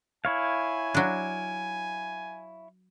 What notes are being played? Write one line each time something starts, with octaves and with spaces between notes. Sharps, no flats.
E4 C#5 F5 G#5
F#3 D4